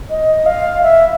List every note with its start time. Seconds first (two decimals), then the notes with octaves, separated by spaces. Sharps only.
0.10 D#5
0.46 F5
0.83 E5